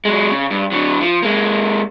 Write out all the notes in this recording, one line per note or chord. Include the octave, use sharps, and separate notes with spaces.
F#3 G#3
C#3
G2
D3 F#3
F3
G#3 A#3